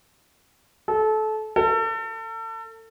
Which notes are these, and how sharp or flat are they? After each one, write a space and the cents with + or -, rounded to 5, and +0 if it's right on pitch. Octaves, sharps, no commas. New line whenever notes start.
A4 -25
A4 +35